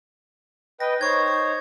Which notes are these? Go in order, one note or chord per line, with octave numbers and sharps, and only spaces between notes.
B4 D#5 G5 A#6
D#4 C5 C#5 C#6 G#6